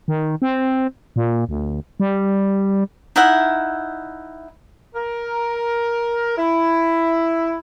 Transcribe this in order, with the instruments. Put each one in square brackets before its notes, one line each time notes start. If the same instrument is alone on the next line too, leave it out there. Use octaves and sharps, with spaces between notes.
[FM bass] D#3
C4
A#2
D2
G3
[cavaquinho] D#4 E4 E5 F#5
[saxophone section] A#4
E4